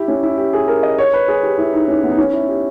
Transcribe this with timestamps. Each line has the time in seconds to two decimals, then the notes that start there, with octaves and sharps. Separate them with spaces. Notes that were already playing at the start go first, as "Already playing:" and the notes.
Already playing: E4 G4
0.08 C#4
0.23 E4
0.38 G4
0.53 G#4
0.68 A#4
0.83 D#5
0.98 C#5
1.13 B4
1.28 G#4
1.43 G4
1.58 E4
1.73 D#4
1.88 C#4
2.03 B3
2.11 D#4
2.18 C#4
2.33 E4
2.48 G4